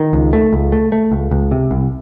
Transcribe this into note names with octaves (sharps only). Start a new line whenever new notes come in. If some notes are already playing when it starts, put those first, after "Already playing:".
Already playing: D#3
C#2
A3
C#2
A3
A3
C#2
C#2
C3
C2